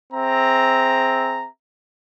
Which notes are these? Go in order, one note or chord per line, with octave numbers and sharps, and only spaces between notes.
C4 G#4 E5 A#5